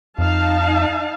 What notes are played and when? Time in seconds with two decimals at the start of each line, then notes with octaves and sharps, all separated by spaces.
0.18 F2 D#4 F5 A5